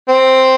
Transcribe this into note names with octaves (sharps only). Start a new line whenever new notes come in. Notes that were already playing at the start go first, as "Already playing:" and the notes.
C4